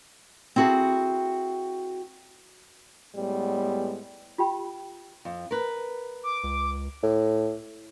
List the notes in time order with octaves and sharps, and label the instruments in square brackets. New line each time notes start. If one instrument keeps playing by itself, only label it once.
[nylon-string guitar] C4 E4 F#4 G#4 A4
[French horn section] A2 G3 G#3 B3
[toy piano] F4 G4 G5 B5
[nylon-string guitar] F2
A#4 B4
[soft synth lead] D6
[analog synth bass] C#2
[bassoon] A2